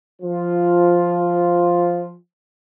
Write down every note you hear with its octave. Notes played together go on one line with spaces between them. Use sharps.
F3 F4